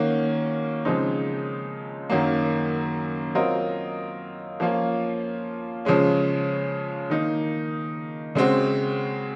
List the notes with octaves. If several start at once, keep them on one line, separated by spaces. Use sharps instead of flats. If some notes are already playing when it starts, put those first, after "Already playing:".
Already playing: D#3 A#3 C#4 F#4
C#3 F3 G#3 C4 D#4
F#2 D#3 F#3 A#3
F#3 C4 F4 A#4 D#5
F3 A#3 C#4 F4
C#3 F3 G#3 C#4
D#3 A#3 D#4
C#3 G#3 C4 F#4